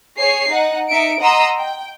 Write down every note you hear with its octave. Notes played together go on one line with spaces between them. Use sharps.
G#4 C#5 C7
D#4 F#5
D#4 E5 C#7 D7
D#5 F#5 A#5 C6 D#6 E6
G5